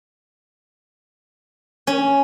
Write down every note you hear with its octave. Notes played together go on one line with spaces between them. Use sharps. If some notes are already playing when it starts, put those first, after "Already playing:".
C#4